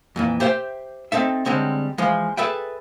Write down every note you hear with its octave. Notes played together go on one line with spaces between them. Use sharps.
F2 A#2 E3
G4 C5 E5 F#5 G5
C4 D#4 A4 E5
D3 G3 G#3 C4 C#4
E3 F3 G#3
G#4 A4 B4 E5 G5